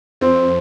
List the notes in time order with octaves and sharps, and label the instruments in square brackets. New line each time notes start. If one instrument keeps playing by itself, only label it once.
[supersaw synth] F2 [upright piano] C4